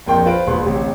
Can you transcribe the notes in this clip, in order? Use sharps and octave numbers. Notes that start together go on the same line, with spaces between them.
A#1 F2 A#4 G5 C6
F4 B4 C5 D7
E1 A#1 B4 C6
D1 A1 C3